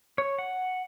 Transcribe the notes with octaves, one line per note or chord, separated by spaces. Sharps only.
C#5
F#5